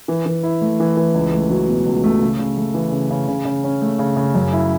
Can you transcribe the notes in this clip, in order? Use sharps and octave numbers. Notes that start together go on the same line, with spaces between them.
E3
E3
E4
A3
E3
E3
C#2
A3
F#3
B2
C#2
A3
C#3
C#3
A3
E3
C#3
C#3
C#3
C#3
C#4
A3
C#3
C#3
F#2
E4